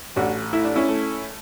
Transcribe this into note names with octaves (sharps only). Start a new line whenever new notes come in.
A1 D4 F#4
A3 E4
D4
C#4 E4
A3